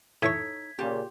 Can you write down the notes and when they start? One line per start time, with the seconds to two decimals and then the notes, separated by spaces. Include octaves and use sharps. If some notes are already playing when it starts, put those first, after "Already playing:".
0.23 A2 D#4 A4 C#5 C#6 G#6 B6
0.79 A#2 C#3 F4 G4